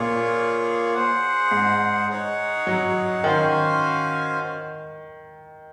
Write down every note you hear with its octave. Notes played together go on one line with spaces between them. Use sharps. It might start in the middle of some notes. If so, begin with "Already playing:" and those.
Already playing: A#2 A#3 F4 G#4 C#5
G#4 C5 F#5
G#2
D#4 G#4 C#5 F#5
F#3
D#3 C#4 F#4 C5 F5 G#5